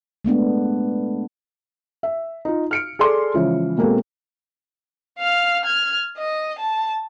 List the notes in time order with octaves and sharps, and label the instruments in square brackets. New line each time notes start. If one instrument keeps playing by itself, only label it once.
[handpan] G#3 A3 B3 D4
[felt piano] E5
D#4 F4
F6 C#7 D7
G#4 A4 D5 C6 D6
C#3 E3 F3 G#3
B2 G#3 A#3 C4 A4
[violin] F5 F6
F6 G#6
D#5
A5